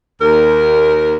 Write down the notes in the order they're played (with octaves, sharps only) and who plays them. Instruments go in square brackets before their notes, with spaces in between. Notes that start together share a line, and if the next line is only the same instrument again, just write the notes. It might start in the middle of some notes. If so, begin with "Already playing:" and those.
[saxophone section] D#2 A#4